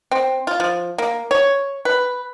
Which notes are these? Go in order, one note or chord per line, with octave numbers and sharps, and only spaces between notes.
C4
F4
F3
A#3
C#5
B4